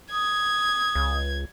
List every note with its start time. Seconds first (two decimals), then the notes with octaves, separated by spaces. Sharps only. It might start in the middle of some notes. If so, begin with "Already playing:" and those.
0.12 D#6 G#6
0.95 C#2